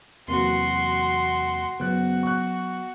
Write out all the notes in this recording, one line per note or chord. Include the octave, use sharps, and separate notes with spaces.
E2 C3 E3 F#3 A#3 F#4 C6
F#1 F#3 B3 F#4 F#6
C#6 F#6